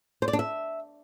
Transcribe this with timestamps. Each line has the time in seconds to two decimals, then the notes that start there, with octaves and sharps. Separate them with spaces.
0.22 C5
0.28 D5
0.33 D4
0.39 E5